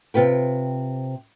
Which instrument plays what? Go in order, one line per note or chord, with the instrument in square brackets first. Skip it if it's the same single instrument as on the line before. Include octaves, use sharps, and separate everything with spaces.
[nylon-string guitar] C3 F4 B4 G5